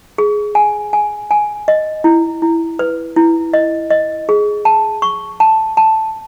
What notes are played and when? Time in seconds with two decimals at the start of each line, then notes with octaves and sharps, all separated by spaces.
0.18 G#4
0.55 G#5
0.93 G#5
1.31 G#5
1.68 D#5
2.04 E4
2.42 E4
2.79 B4
3.16 E4
3.53 D#5
3.90 D#5
4.29 G#4
4.65 A5
5.02 C#6
5.40 A5
5.77 A5